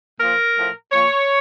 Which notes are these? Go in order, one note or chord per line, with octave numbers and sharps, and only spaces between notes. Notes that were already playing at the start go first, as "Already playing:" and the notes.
A#2 F3 A#4
A2 F3
A#2 F3 C#5